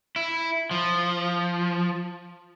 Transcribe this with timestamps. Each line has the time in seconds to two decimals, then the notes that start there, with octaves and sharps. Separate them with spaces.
0.16 E4
0.71 F3